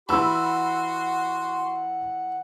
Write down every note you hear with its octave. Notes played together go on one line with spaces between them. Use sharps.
E3 F#4 F#5 B5 C6 E6